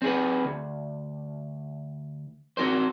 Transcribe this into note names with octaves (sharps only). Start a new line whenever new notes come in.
C4 G#4 B4
D2
C4 F#4 A#4 C5